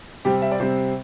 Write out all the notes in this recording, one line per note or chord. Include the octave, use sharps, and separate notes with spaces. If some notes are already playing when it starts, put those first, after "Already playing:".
C3 G3 C4 G4
E5
D5
C3 G3 C4 C5